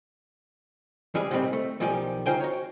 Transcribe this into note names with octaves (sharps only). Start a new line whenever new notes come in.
E3 F3 G3 G#3 G#4
A2 C3 D#3 F#3 G3 C4
A3
B1 D#3 F3 G3 G4 G#5
A3 D#4 F4 C5 G5 G#5
F#4 C#5